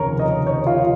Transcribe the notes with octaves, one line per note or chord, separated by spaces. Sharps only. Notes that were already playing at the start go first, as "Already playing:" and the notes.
Already playing: F1 D#2 C#3 F3 A#4 C#5
D#5
C#5
F4